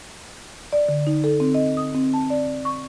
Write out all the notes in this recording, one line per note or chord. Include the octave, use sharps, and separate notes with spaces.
D5
D3
D#4
A4
C4
D#5
D#6
C4
A5
D5
C#6